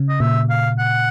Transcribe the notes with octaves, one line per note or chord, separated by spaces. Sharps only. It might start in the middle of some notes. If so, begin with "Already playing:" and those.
Already playing: C#3
D#5
A#2 E5
F5
F#5